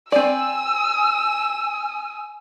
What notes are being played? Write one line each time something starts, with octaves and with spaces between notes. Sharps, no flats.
C4 D5 G#5 E6